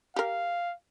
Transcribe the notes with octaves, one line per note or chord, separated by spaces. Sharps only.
G4 A#4 F5